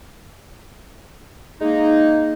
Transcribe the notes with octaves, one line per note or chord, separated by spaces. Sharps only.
G#3 A#3 D#4